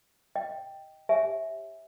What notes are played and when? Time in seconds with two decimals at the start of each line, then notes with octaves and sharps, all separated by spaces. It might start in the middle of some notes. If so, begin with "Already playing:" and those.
0.35 D#5 G5
1.09 G4 C#5 E5 G#5